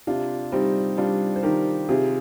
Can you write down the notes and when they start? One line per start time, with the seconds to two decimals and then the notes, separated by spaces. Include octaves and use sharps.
0.07 C3 D4 F4
0.52 G3 C4 D#4
0.97 G3 D4 F4
1.36 C5
1.43 D#3 G4 A#4
1.88 C3 F4 G#4